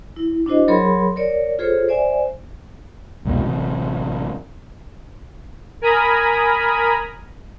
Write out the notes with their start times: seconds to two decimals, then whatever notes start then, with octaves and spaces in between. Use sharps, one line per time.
0.16 E4
0.46 D4 E4 F#4 C5 D#5
0.68 F#3 G#4 A#4 C#5 B5 C6
1.16 A#4 C#5 D5
1.59 F4 G#4 A4 C5 C#5
1.88 C5 D5 E5 G#5
3.25 C2 F2 G#2 B2
3.44 A1 C3
5.82 A#4 G#5 A#5 B5 D#6